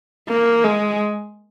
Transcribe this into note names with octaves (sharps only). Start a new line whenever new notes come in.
A#3
G#3